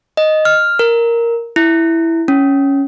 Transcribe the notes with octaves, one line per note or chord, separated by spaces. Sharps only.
D#5
F6
A#4
E4
C#4